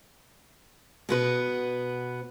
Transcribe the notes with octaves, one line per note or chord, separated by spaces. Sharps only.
B2 B3 B4